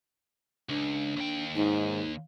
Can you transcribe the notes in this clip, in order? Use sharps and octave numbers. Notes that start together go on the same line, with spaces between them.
C#2 D4
D#2 G5
G#2 D#4